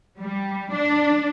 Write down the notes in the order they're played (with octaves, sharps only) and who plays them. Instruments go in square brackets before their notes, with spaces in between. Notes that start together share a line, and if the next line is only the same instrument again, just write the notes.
[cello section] G3
D4